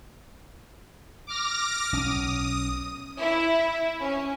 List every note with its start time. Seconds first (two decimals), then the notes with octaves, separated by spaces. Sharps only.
1.27 D6 F6 A#6
1.93 B1 C#4 D#6
3.19 E4 E5
4.00 C#4